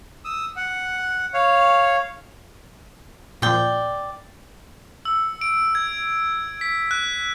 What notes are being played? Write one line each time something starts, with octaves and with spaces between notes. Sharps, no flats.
D#6 E6
F#5
C#5 F5
A#2 F3 D5 G5
E6
D7
G#6
B6
F#6